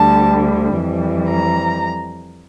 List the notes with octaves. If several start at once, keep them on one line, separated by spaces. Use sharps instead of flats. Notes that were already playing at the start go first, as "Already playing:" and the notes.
Already playing: D2 D3 G3 A5
F2 E3 G3
A#5